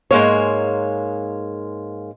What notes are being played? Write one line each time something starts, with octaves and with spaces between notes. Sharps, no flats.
G#2 G#3 A#3 C#5